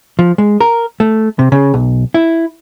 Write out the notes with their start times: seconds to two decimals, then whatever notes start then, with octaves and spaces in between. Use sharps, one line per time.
0.19 F3
0.38 G#3
0.60 A#4
1.00 A3
1.39 C3
1.52 C#3
1.74 B1
2.14 E4